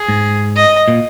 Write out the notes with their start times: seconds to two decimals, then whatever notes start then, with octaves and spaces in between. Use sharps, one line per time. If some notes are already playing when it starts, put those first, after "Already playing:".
Already playing: G#4
0.09 G#2
0.56 D#5
0.88 A#2